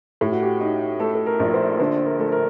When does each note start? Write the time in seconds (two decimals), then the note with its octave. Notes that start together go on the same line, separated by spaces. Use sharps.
0.21 A2 G4
0.32 F#4
0.43 G4
0.60 D#4
1.00 A3 A4
1.15 A4
1.26 A#4
1.39 A#1
1.54 C5
1.79 D3 C5
2.06 A#4
2.19 A3
2.32 A#4